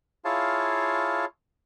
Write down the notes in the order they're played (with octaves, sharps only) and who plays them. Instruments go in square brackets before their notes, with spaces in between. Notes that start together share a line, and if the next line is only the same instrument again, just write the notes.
[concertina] E4 F4 G#4 C#5 F5 A5